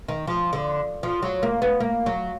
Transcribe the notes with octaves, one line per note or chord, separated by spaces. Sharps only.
D#3
F3
D3
F3
F#3
A#3
B3
A#3
F#3